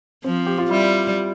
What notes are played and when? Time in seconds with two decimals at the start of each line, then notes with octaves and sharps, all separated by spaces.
0.24 F3 C4
0.46 G4
0.58 F4
0.70 G3 E4